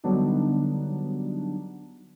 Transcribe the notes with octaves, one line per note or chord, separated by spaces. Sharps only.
D3 F#3 G3 B3 D4 D#4